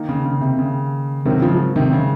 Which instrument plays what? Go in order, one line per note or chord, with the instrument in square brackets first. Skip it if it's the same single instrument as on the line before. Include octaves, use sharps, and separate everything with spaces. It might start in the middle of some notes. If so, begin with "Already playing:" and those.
Already playing: [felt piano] D#3 A#3 D#4
[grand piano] C#3
C#3
C3
C#3
[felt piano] G#2 F#3 C4 F#4 A#4 [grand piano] C3 D#3
[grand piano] C#3 F3
C3 D#3
C#3